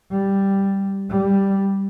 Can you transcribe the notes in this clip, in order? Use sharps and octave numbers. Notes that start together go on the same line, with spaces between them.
G3
G3